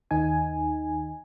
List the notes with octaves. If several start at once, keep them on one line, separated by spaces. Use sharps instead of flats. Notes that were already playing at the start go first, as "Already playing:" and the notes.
D#2 D#3 D#4 G#5